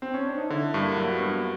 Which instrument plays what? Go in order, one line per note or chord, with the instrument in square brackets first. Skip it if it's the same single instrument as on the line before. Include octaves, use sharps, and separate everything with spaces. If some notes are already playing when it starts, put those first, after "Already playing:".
[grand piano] C4
C#4
D4
D#4
[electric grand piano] D3 [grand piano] E4
[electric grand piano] G2
[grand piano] A#3
[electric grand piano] F#3 [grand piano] A#3
[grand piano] B3
[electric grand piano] G2